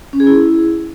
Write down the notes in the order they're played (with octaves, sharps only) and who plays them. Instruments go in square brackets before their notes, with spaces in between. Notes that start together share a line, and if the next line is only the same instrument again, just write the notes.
[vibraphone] C#4
G#4
E4